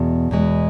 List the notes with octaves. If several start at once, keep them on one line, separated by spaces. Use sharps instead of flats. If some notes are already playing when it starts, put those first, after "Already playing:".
Already playing: E2 B2 G#3
E2 B2 G#3